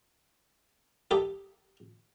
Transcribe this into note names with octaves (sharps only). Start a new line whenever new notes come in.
D#4 G4 A4